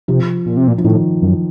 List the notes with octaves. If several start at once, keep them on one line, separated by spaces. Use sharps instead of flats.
C3 F3
A#2
C3
A#2
F3
A2 D#3
F#2